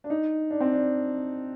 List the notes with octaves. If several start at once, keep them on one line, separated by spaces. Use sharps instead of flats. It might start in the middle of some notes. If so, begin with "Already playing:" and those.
D4
D#4
D4
C4
D4